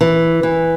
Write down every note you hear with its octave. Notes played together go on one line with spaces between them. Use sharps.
E3
E3